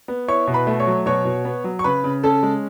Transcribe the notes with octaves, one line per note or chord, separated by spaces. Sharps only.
B3
E4 C#5 C#6
B2
B4 B5
A3
C#5 C#6
F#3
B2 C#5 C#6
B2
B3
F#3
C#6
C#3 B4 B5
C#3
C#4 A4 A5
G#3